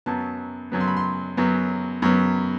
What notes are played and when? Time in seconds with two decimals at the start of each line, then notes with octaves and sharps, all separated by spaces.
0.06 F#2 F#3 B3 A5
0.72 F#2 F#3 B3
0.80 C6
0.88 B5
0.97 C6
1.37 F#2 F#3 B3
2.02 F#2 F#3 B3